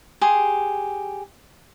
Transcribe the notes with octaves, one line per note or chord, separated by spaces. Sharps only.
G4 G#4 C6